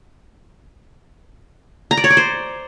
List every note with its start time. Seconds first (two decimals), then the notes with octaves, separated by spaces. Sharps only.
1.91 A#5
1.97 D5
2.04 C#5
2.10 D5
2.17 C5